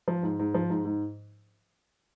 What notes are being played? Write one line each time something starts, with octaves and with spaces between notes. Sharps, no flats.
F3
G#2
G#2
F3
G#2
G#2